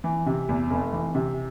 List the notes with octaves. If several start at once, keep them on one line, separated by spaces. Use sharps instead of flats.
E3
C3
E2
F1
E3
C3